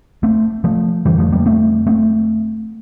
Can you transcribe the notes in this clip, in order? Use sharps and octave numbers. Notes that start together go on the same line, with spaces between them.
A3 C4
F3 A3
F2 D3 E3 G3
F3 A3
G3 A#3
A3 C4
A3 C4